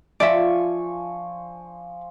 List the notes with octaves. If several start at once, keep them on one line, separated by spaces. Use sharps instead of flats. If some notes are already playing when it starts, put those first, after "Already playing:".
F3 D5 E5 G#5 C#6